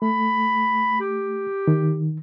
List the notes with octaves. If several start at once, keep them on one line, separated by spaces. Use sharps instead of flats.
A3 B5
G4
D#3